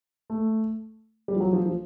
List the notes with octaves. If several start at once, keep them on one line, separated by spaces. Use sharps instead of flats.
A3
G3
F3
F#3
F3
F3